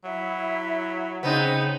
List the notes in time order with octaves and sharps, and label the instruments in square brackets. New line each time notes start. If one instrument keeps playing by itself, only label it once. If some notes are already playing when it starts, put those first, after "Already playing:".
[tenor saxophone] F#3 [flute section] E4 E5
[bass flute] C#3 [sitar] B3 C4 D#4